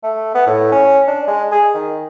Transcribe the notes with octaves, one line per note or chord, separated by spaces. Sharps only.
A3
B3
A2
C#4
D4
G#3
G#4
D#3